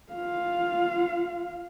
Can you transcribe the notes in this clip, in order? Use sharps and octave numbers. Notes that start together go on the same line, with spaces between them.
F4 F5